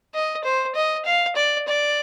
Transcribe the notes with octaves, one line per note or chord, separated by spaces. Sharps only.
D#5
C5
D#5
F5
D5
D5